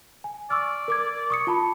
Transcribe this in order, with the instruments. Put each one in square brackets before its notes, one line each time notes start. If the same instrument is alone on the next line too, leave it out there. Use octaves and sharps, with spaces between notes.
[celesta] G#5
[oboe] D5 [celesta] C#6 E6 F6
[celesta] A#4 D6 G#6
C#6 D#6 C#7
F4 A5 B5